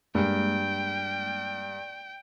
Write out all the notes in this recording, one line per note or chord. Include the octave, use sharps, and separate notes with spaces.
G2 G#3 A#3 G5